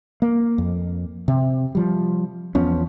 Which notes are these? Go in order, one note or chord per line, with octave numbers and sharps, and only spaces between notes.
A#3
F2
C3
F3 G3
E2 F3 B3 C#4